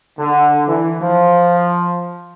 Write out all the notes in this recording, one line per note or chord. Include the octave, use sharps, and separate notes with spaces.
D3
E3
F3